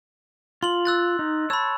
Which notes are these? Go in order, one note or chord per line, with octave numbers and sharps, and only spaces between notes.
F4 C6 F#7
E6 F#6 A6
D#4
C#5 A5 B5 E6